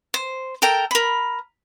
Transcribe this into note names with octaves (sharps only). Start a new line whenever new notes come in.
C5
A4 A#4 G5 A#5
A#4 B5